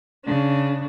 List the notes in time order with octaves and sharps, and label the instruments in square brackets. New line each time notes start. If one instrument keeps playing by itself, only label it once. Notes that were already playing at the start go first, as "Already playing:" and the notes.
[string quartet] C#3 D4